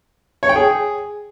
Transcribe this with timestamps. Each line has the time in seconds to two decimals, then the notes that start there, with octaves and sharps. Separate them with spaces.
0.43 C#5
0.49 G5
0.56 G#4